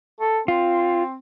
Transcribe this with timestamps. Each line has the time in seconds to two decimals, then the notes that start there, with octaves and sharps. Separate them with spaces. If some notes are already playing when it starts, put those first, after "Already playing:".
0.21 A4
0.48 C4 F4